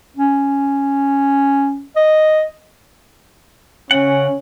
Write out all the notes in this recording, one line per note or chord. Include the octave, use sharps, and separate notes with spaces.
C#4
D#5
C#3 C#4 F#5